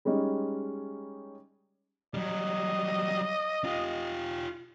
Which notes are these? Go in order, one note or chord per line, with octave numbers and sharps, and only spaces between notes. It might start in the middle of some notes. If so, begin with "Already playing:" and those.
G3 G#3 C#4 D#4
F#3 G3 D#5
F4 G4